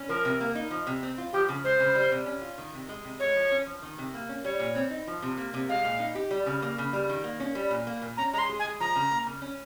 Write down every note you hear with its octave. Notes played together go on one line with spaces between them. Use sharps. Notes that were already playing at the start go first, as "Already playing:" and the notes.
Already playing: C#4
F3 A#4
C3
A#3
D#4
F3
C3
C4
F4
F3 G4
C#3
G#3 C5
C#3
G3
C3
C#4
F4
D#3
C3
G#3
C3
G#3 C#5
F3
C#4
F3
D#3
C3
A#3
C#4
G3 C#5
A#2
C4
D#4
F3
C3
A#3
C3
G#3 F5
A#2
D#4
G4
G3
C#3
A#3
C#3
G3
D#3
A#3
C#4
G3
A#2
A#3
A#2
C#4 A#5
G#3 A#5
C6
G#4
G#5
G#3
F3 A#5
C#3
A#3
C#3
C#4